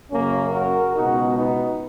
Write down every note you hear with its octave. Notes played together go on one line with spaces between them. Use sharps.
F#2 C#3 F#3 A#3 C#4
F#4 A#4
C#2 B2 G#3 D#4 F#4
B3 D#4